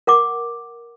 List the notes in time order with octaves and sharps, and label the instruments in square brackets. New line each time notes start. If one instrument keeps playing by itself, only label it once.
[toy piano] A#4 F#5 D6